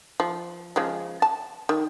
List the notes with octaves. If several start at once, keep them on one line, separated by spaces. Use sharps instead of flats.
F3
C#3 F3 G#3
A5
D#3